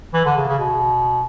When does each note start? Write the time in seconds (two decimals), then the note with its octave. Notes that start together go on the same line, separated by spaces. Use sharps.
0.13 E3
0.25 D3
0.36 C#3
0.48 C#3
0.59 B2